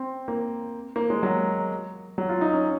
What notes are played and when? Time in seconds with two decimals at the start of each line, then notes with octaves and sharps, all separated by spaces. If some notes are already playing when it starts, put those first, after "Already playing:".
Already playing: C4
0.28 A#3
0.96 A#3
1.10 G#3
1.23 F#3
2.18 F#3
2.29 F4
2.41 D#4
2.53 C#4